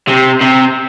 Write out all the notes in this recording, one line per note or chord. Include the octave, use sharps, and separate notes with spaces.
C3
C3